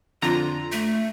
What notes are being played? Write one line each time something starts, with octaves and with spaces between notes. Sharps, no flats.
F2 D3 F4 A#5
A3